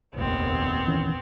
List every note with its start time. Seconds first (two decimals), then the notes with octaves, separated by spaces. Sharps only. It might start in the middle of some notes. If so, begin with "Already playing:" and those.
0.16 F1 A#1 D#2 B3 C4
0.87 D#3 E3 C#4